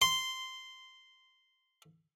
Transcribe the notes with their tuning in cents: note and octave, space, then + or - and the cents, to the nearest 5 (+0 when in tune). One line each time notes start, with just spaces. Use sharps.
C6 -10